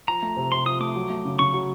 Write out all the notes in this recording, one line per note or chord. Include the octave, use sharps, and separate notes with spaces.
F3 A#5
A3
C3
C3 C6
F3 D#6
A3 D6
F#3
A3
C#3
C#3 C#6
F#3